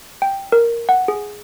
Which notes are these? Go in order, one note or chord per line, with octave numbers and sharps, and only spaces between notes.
G5
A#4
F#5
G#4